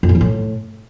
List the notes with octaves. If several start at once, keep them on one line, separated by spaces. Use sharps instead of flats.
F2
A2
E3
A2